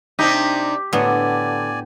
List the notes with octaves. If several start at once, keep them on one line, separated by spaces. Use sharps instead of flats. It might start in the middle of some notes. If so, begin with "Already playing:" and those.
C3 D4 D#4 G4
A2 D3 B3 D5 G#5